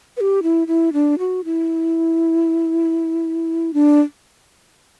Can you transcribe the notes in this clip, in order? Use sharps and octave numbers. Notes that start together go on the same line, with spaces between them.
B4
G4
E4
E4
D4
F#4
E4
D4